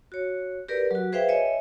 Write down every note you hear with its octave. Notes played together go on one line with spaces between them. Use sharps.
F#4 C#5
G4 A#4 B4 D5
F#3 F#4
G#4 B4 C5 E5 F5 G5
C#5 D#5 E5 G#5